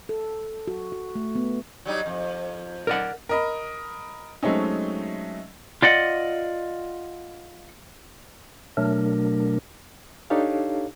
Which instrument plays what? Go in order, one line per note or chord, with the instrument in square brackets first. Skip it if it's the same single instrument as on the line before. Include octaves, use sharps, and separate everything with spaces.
[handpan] A4
F#4
F#4
A3
B3
[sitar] F#3 G3 D#4
F2
[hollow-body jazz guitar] A#4 D5 F#5
[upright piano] A#4 D#5 B5
F#3 G#3 A3 C4 C#4 D#4
[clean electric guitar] F4 D5 D#5 F#5
[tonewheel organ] B2 F#3 A3 D4 A#4
[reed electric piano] D4 D#4 G4 A4 C#5 F5